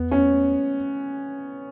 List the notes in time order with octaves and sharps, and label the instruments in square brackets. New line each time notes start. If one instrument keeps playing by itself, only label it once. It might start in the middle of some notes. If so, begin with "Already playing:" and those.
Already playing: [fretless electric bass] E2 [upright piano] B3
[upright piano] C#4